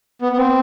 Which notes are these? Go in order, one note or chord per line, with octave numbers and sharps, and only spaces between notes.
B3
B3
C4